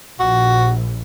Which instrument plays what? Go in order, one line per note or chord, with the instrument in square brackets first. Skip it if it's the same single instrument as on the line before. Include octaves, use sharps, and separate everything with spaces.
[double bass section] A#1 [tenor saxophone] F#4